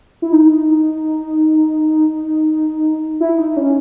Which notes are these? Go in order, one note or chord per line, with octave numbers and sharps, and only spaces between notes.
E4
D#4
E4
D#4
C#4